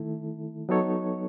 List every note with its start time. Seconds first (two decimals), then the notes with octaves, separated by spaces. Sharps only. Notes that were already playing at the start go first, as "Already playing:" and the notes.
Already playing: D#3 A3 E4 A4
0.69 F#3 B3 D#4 A4 C#5